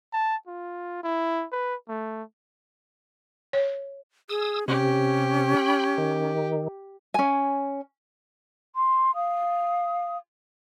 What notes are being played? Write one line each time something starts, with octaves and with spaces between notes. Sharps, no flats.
A5
F4
E4
B4
A3
C#5
G#4 D#6 E6
C3 C#4 G4
G5 B5
D#3
C#4 G#5
C6
F5 D#6